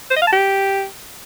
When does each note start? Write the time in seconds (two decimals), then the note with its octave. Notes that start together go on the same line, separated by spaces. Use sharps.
0.11 C5
0.16 D#5
0.22 F5
0.27 A5
0.33 G4